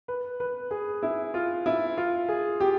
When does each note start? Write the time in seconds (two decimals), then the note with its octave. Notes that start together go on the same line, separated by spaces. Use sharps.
0.08 B4
0.40 B4
0.71 G#4
1.03 E4
1.34 F4
1.66 E4
1.97 F4
2.28 G#4
2.60 G4